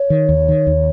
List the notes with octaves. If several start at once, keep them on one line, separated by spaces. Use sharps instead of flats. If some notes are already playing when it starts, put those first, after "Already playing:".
Already playing: C#5
D#3
D#2
D#3
D#2